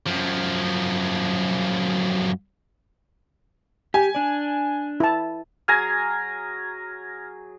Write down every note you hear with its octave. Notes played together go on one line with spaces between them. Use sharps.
F#2 F3
G4 G#5
D4 D5
E4 A5
F#3 G#4 G#5 F6 G#6 A#6